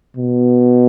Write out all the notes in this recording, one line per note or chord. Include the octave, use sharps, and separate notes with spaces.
B2